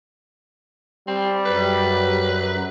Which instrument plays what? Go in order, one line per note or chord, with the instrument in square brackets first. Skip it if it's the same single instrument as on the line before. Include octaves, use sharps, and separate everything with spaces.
[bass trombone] G3 [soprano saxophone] C4
[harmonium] F#2 F#3 [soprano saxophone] B4